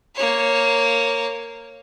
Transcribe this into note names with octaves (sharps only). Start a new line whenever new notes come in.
A#3 C#5